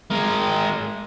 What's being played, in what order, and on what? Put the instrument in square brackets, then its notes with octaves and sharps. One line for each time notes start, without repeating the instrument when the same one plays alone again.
[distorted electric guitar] G#3 A#4